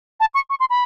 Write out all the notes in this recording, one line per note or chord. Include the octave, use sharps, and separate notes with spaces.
A5
C#6
C#6
C6
B5